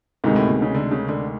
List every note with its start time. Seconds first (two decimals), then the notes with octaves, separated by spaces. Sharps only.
0.24 D2 G#2 C3 D#3 G#3
0.36 A2
0.48 B2
0.62 C#3
0.75 D3
0.91 C#3
1.09 D3